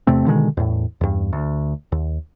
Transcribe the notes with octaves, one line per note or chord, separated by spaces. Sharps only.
E2 C3 A3 C4
B2 D3 D#3 G#3
E2 A2
E2 G2
D2
D#2